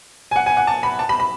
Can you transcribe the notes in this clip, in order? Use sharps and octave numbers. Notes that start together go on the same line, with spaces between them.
G#5
F#5
G#5
F#5
A5
B5
A5
B5
B5